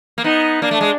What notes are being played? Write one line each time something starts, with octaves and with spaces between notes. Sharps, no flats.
A#3
B3 D#4
A#3 D4
A3
G#3